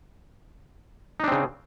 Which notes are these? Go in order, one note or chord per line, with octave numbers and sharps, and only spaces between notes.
C#3 C4 D4 D#4